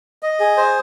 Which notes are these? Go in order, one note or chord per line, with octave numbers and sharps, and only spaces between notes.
D#5
G#4
C5